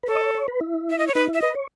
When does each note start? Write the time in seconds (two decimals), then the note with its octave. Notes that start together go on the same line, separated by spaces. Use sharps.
0.03 B4
0.07 A4 C#5
0.15 D#5
0.21 C#5
0.35 C#5
0.48 B4
0.61 E4
0.90 E5
0.99 D#5
1.08 C#5
1.14 D#4 B4
1.28 E4
1.34 E5
1.41 B4 D#5
1.55 C#5